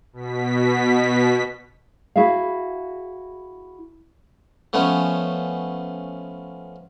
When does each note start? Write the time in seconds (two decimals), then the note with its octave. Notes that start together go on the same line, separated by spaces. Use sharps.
0.13 B2 B6
2.16 E4 F#4 G#4 E5 F5
4.73 F3 A3 B3 C#4